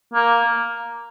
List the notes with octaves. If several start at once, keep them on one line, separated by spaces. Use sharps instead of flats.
A#3